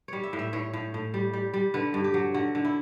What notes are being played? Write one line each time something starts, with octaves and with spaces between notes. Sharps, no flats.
G3 C#5
E5
A2
E5
A2 C#5
A2
A2
G3
G3
G3
D3 B4
G2
G4
F#3
D3 F#4
D3
E4